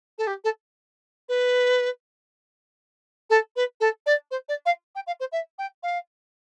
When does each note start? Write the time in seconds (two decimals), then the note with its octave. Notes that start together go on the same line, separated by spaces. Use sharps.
0.18 A4
0.27 G4
0.44 A4
1.29 B4
3.30 A4
3.56 B4
3.81 A4
4.06 D5
4.31 C5
4.49 D5
4.66 F5
4.95 G5
5.07 F5
5.20 C5
5.32 E5
5.59 G5
5.83 F5